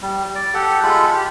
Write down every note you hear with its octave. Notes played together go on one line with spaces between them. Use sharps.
G3
D5
G4 A4 F#5
G#3 F4 A4 B5
G4